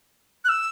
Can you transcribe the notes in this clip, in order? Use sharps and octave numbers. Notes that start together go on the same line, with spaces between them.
F#6
E6